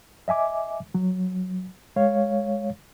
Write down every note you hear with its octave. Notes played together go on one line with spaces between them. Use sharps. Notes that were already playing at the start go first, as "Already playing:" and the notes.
D#5 E5 G#5 D6
F#3
G#3 C#5 F5